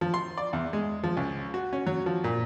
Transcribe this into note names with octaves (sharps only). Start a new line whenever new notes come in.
F3
C6
D5
E2
G#3
F3
C#2
F#4
C#4
F#3
F3
A#2